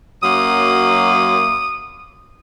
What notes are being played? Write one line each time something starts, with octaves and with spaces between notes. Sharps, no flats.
F#2 F#3 A#3 D#6